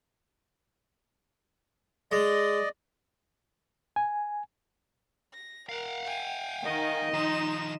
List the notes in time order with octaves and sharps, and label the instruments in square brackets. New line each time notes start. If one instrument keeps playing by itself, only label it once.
[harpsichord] G#3 [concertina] D5 D#5
[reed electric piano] G#5
[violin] A#6
[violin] A#4 [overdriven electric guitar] F5 F#5
[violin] G5 G#5
[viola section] D#3 [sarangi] D#5
[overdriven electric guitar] D#3 F3 [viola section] D#4 [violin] C6 E7